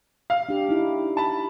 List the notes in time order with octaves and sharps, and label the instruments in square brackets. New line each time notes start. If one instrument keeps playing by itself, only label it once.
[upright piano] F5
[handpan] D4 G4
D#4 E4
[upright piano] A5 B5